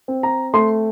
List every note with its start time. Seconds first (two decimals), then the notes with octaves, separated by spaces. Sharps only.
0.08 C4
0.23 A#5
0.54 A3 C6